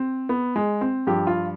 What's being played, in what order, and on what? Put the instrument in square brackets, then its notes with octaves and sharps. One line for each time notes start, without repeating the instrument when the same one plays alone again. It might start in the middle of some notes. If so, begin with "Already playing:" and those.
Already playing: [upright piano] C4
B3
G#3
C4
G2 F3 G4
F4